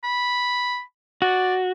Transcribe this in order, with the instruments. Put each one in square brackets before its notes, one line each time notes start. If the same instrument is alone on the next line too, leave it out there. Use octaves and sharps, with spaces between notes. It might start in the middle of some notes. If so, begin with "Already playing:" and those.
[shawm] B5
[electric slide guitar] F#4 [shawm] D5